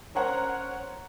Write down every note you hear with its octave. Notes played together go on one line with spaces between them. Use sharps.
C#4 A#4 C5 C#5 F#5 A#5